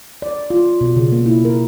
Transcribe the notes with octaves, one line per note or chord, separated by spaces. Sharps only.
D5
F4
B2
C#3
A#3
E4
A#4